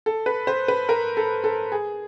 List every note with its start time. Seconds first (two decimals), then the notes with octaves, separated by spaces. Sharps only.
0.06 A4
0.26 B4
0.47 C5
0.68 B4
0.89 A#4
1.17 A4
1.44 A4
1.72 G#4